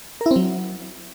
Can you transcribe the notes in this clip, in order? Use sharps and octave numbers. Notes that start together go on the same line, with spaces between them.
A#4
E4
C4
F#3